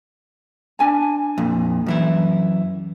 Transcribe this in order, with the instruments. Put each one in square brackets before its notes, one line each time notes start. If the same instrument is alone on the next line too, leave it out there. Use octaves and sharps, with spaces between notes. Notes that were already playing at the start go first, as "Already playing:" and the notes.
[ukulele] D4 G#5 A5
[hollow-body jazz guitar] F2 A#2
F#2 E3 E4